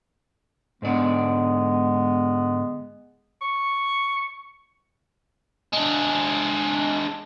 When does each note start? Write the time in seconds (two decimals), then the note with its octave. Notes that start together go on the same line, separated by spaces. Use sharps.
0.82 G#2 D3 G#3 B3 D5
3.42 C#6
5.73 G#3 D4